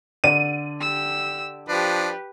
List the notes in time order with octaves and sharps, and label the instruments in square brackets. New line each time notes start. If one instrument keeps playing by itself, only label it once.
[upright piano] D3 D5 [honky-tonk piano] D#7
[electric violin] G4 E6
[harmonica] F3 D4 [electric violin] G4 B4